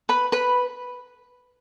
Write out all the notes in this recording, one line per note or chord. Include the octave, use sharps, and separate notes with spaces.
B4 B5
B4 B5